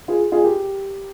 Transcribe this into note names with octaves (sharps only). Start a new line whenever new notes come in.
F4 G#4
F4 G#4
G4 A#4